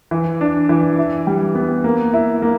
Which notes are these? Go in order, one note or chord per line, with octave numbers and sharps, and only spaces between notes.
E3
D4
E3
E4
G3
B3
A#3
E4
A#3